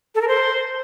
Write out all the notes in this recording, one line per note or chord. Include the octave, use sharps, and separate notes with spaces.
A4
A#4
C5